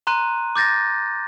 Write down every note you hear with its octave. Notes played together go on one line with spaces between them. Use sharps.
A#5 C6 F#6 D#7
D6 G6 A6 A#6